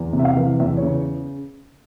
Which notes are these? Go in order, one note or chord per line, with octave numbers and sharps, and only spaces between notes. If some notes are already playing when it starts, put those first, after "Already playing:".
Already playing: E2
C3
E5
F5
E3
E2 E5
C#5
C#3